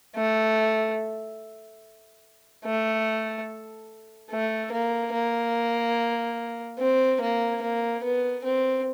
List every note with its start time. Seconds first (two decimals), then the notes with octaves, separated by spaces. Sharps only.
0.16 A3
2.65 A3
4.30 A3
4.71 A#3
5.13 A#3
6.79 C4
7.21 A#3
7.62 A#3
8.03 B3
8.44 C4